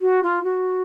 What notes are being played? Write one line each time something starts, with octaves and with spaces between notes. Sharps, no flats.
F#4
F4
F#4